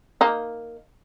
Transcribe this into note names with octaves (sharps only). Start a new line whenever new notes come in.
A#3 D#4